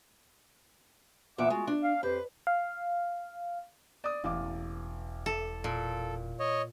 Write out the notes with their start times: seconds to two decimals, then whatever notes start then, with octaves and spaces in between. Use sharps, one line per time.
1.38 E2 A#2 D5 E5 F#5 D6
1.50 G#3 A3 F4 F#4
1.67 D4
1.83 F5
2.03 F2 G4 B4 C5
2.47 F5
4.04 D5 D#6
4.24 E1 A1 F5 D6
5.26 A4
5.64 A#2 A4
6.39 C#5 D#5